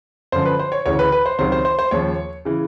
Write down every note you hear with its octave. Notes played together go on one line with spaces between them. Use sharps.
F#2 D3 F3 C5
B4
C5
C#5
D2 C#3 E3 C#5
B4
B4
C5
C#2 C3 D#3 F#3 C5
C5
C5
C5
D#2 C#3 F3 C#5
C#3 E3